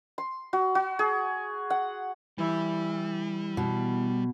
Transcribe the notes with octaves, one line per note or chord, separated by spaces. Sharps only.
C6
F#4
F#4
G#4
F#5
E3 G3 E4
B2